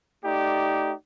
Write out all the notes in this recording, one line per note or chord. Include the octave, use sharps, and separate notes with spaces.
A3 D#4 G4 D5